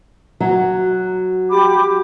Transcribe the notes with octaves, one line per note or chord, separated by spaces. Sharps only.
F#3
G4 B5 D6